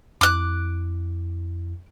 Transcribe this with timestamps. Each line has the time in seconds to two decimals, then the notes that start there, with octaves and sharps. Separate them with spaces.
0.21 F2 E4 D6 F#6